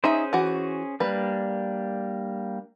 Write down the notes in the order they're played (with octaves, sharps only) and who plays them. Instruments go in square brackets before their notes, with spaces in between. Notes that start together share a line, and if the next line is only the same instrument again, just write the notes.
[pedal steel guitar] C#4 G#4 C5 [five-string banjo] D#4 E5
[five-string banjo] E3 F#4
[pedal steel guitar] G3 A#3 D4 [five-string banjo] B4